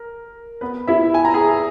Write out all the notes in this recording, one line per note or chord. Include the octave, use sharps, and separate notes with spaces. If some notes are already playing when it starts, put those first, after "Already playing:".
Already playing: A#4
B3 B4
E4 E5
G#5
A#5
G#4 G#5